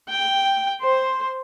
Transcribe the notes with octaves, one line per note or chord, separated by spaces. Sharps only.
G5
C5